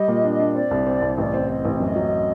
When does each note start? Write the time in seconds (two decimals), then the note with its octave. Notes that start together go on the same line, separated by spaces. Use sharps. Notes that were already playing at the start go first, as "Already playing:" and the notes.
Already playing: G3 D#5
0.08 A#2
0.24 D4
0.40 D4
0.55 C4 D5
0.71 C2
0.87 C4
1.02 C2
1.18 A1 D#5
1.21 D5
1.34 C4
1.49 C4 D#5
1.65 A1
1.80 F#2 D#5
1.96 F#3